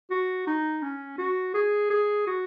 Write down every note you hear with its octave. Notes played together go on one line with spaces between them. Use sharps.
F#4
D#4
C#4
F#4
G#4
G#4
F#4